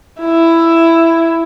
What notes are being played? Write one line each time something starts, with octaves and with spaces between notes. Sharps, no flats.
E4